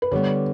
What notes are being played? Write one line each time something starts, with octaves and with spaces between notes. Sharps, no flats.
B4
D3 G3 B3 C#5